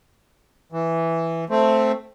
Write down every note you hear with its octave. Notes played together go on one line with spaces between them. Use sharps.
E3
A3 C4